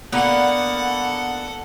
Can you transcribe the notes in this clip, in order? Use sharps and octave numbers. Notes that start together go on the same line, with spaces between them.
D3 A#3 B3 A4 F#5